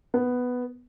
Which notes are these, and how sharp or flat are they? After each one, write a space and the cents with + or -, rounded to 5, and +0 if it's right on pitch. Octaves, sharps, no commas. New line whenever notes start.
B3 +5